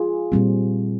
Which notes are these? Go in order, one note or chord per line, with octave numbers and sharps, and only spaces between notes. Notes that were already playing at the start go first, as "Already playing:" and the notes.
Already playing: F4 G#4
A#2 G3 C4